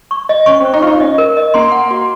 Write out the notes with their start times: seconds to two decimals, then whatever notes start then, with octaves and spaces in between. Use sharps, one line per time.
0.11 C#6
0.29 D#5
0.46 C#4 C#6
0.60 C4
0.64 C5
0.73 D#4
0.82 F4 C#6
0.87 D#4
1.00 C#4 D#5
1.18 A#4
1.37 D#5
1.54 A#3 C6
1.72 F#5
1.91 F#4